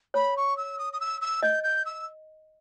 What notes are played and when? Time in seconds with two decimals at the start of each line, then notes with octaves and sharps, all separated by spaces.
0.14 C#5 B5
0.37 C#6
0.57 E6
0.78 D#6
0.93 D#6
1.00 E6
1.21 E6
1.43 D#5 G6
1.63 G6
1.85 E6